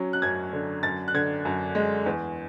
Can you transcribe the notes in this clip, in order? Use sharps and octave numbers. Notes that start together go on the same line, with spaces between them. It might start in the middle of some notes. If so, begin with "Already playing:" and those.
Already playing: F#3 C#4
F#6
F#2 G#6
D3
F#2 A6
F#6
D3 G#6
F#2
G#3
E2